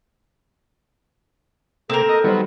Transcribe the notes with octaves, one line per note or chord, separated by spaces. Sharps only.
C3 A#3 C4 A4 A#4
D#5 A#5
D#3 F#3 G3 B3 C5